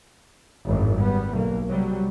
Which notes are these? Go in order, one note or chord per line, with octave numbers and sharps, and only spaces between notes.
G#1 F#2 A2 D#3
G3 B3
B1 A#3
C3 F#3 G3